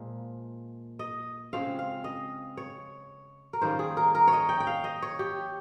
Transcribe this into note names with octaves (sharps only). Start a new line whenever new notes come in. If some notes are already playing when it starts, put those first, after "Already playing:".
Already playing: A#2 F3 G#3
D#5
C#3 G#3 C4 F4 F5
F5
D#5
C#5
A#4
D#3 G3 A#3 C#4 C5
G#4
A#4
A#4
C#5
D#5
G5
G5
F5
D#5
C#5
G4